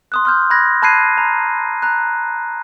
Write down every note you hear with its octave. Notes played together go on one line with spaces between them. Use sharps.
C6 D#6 F#6
C6 F6 G6
B5 F#6 G#6 A#6
A5 B5 F#6 G#6 C7 D#7
A#5
A#5 F#6